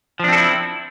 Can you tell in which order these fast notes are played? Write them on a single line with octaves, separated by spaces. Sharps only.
F3 D4 C4 A4 E4